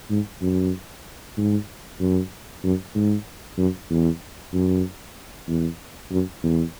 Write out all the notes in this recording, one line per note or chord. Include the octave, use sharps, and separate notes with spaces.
G#2
F#2
G#2
F#2
F#2
G#2
F#2
E2
F#2
E2
F#2
E2